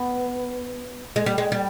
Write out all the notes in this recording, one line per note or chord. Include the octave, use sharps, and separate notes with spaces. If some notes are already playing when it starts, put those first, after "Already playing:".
Already playing: B3
G#3
G3
G#3
G3